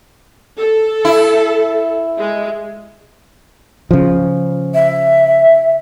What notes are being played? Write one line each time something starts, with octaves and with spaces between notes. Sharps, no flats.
A4
E4
G#3
C#3 F3
E5